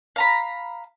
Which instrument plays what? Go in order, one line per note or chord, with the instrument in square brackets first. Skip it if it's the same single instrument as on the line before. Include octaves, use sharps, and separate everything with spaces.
[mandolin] F5 A#5 B5